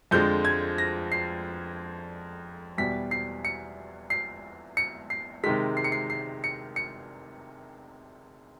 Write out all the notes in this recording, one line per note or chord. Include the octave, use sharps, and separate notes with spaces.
F2 D3 F3 G#3 G6
G#6
A#6
C7
E2 B2 G3 B6
C7
C#7
C7
C#7
C7
C3 D#3 G#3 B6
C7
C#7
C7
C7
C#7
C#7